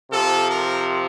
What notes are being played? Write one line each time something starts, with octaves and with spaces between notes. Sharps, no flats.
C3 F3 A4
A#4